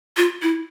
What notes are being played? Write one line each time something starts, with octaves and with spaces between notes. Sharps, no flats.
F4
E4